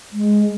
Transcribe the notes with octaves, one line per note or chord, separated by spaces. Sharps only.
G#3